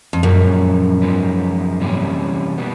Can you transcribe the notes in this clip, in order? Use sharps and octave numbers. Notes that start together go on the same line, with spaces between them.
F2
F#2 A#2 F3 G#3 C#4 F4
G#2 F3 G#3 B3
C3 E3 G3 A#3 C#4
B2 G3 B3